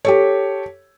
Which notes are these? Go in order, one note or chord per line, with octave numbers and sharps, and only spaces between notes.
G4 A4 C#5